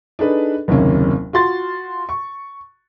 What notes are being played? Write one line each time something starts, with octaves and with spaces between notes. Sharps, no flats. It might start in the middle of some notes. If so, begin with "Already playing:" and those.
D4 D#4 G#4 A4 B4
F#1 D#2 C3 A#3 C#4
F4 F#4 C6 A6
C#6